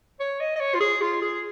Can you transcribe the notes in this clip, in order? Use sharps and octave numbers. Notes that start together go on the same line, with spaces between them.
C#5
D#5
D#5
C#5
F4
G#4
F4
G#4